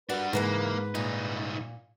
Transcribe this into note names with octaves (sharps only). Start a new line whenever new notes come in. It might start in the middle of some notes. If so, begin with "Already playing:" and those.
G3 D4 F#4 A#4 B4
G#2 C#3 E3 G#3 A#3 B4
C2 A#2 D#4